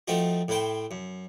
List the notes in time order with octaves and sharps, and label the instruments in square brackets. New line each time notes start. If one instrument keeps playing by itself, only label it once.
[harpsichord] F3 A3 C4 D#4 F#4
A2 E4 C5 G5
F#2